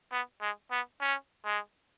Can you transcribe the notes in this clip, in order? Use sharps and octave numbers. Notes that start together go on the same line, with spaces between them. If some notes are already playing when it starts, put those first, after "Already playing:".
B3
G#3
B3
C#4
G#3